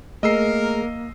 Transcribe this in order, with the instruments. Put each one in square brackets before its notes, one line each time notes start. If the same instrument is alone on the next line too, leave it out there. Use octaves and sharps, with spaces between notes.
[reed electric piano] A3 G#4 [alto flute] A#3 [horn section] A#4 [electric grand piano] D#5 E6 C7